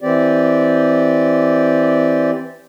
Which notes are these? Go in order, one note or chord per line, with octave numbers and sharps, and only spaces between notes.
E3 C4 G4 D5